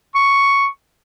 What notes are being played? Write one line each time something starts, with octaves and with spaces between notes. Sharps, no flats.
C#6